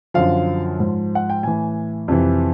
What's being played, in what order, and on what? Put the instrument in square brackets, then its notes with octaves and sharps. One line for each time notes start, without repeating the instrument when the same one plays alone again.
[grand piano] F#2 D3 F3 F5
G#2 F3
F#5
G5
A2 E3 G#5
F2 C3 E3